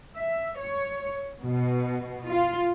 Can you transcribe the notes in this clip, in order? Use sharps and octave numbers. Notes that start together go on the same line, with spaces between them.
E5
C#5
B2
F4